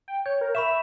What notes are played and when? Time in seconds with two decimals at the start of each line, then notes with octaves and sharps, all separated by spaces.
0.08 G5
0.26 C#5 G6
0.41 A#4
0.55 E5 B5 C#6 E7